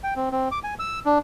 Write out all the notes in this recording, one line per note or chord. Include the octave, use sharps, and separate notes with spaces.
G5
C4
C4
D6
G#5
E6
D4